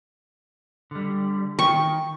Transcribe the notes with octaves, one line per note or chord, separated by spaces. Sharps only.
D3 G3
D#3 G5 C#6